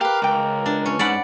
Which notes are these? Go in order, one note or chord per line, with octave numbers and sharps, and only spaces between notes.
G4 A#4 B4 F5
C#2 G5 D6
D4
C#4
G#2 D5 F#5 B5